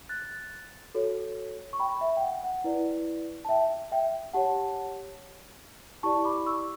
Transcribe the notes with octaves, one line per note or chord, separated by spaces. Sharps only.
F#6 A6
F#4 A4 C#5
C#6
G5 B5
E5
G5
F#5
F#5
E4 B4 D5
A5
E5 G5
E5 G5
G4 C#5 F#5 A5
E4 G4 D5 A5 C#6
B5 D6
C#6 E6